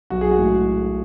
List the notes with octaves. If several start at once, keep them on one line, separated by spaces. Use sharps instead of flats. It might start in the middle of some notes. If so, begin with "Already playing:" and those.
B1 F#4
G#4
F#4
A2 G#3